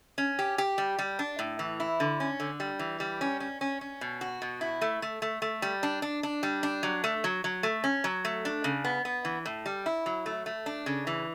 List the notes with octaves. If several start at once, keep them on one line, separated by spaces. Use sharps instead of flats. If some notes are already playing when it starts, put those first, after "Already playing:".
C#4
G4
G4
G3
G3
D4
A2
E3
E4
D3
C#4
D3
G3
E3
G3
C#4
C#4
C#4
C#4
B2
F#4
B2
E4
A3
A3
A3
A3
G3
D4
D4
D4
G3
D4
F#3
A3
F#3
F#3
A3
C#4
F#3
A3
D4
C#3
B3
B3
E3
A2
G3
E4
F#3
A3
A3
D4
C#3
E3